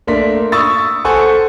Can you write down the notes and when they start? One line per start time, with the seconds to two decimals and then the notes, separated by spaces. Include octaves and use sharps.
0.07 A3 A#3 D4 C6 B6
0.52 C#6 D#6 E6 A6
1.05 A4 C5 F#5 G#5 C6 C#6